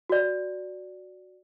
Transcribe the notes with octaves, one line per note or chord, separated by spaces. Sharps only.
F#4 D5